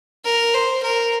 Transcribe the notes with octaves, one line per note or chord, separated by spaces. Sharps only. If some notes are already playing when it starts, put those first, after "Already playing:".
A#4
C5
A#4